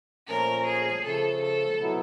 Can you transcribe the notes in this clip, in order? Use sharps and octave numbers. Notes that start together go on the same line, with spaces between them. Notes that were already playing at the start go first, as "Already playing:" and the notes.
A#2 F3 A3 C#4 A#4
G#4
C#3 F3 A3 A4
A4
B2 F#3 B3 E4